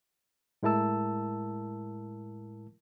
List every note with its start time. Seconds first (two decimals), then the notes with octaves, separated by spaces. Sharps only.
0.63 A2 G#3 E4 A#4 A5 E6